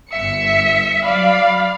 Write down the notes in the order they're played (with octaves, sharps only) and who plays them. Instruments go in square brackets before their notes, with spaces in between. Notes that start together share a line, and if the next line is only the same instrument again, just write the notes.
[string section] G1 C#7 [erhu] E5
[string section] F#3 D5 B5 [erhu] F5